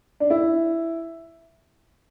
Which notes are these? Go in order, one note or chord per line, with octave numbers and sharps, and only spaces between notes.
D4
E4